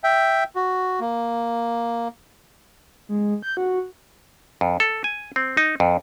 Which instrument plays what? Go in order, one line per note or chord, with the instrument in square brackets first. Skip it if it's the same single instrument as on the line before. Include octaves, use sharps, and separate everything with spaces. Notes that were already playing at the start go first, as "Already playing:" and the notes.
[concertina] E5 G5
F#4
A#3
[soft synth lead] G#3
G6
F#4
[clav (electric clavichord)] F2
A4
G#5
C4
D#4
F2